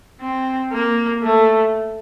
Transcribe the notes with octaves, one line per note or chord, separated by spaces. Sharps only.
C4
A#3
A3